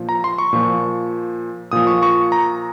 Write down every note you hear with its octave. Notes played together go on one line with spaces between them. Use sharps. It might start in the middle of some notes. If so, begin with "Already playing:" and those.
Already playing: A#2 F3
A#5
C6
C#6
A#2 F3
A#2 F3 D#6
C#6
C#6
A#5